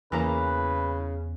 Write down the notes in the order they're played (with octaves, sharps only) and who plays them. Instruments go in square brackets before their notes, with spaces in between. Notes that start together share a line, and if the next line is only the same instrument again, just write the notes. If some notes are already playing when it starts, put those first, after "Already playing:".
[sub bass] E2 [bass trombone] C#3 [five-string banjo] E3 A#3 A#5 [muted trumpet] B4